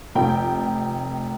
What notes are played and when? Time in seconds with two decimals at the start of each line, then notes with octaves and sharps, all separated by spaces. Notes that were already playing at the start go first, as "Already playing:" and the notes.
0.15 F1 G5